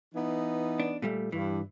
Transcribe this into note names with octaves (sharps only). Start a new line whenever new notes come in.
E3 B3 D#4
D4
A#2 G3 A3
G2 E3